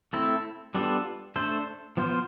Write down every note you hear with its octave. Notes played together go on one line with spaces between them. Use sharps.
A3 C4 E4 A4
G3 B3 D4 F4 A4
A3 D4 A4 C5
F3 B3 F4 C5